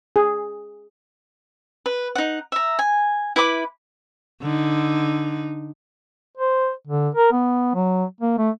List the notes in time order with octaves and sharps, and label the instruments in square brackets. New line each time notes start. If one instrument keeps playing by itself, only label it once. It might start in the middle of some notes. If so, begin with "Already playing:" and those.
[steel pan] G#4
[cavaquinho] B4
D#4 F#5
E5 A#5
G#5
E4 B4 B5 D6
[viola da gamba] D3 D#4
[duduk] C5
D3
A#4
B3
F#3
A#3
A3